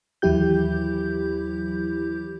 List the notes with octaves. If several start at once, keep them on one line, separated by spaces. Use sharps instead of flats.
D#2 E3 F#3 E4 G4 G6